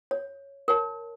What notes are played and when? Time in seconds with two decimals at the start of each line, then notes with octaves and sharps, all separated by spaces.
0.11 C#5
0.68 A#4 C#5 A5